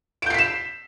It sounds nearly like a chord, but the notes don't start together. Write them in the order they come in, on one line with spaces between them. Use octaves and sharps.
D7 G6 C7 B6 E7